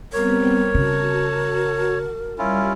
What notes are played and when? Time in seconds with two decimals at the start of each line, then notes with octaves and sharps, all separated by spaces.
0.13 G3 B3 C4 A#4 C#5
0.75 C#3 F#4 A5
2.38 G3 C#4 E4 F4